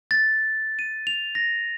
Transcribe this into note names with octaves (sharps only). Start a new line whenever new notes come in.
A6
D#7
F7
A#6